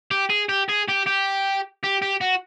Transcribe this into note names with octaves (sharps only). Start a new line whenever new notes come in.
G4
G#4
G4
G#4
G4
G4
G4
G4
F#4